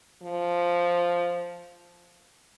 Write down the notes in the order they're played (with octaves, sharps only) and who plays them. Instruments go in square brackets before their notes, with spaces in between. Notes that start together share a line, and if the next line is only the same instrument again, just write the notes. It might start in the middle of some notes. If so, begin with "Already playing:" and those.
[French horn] F3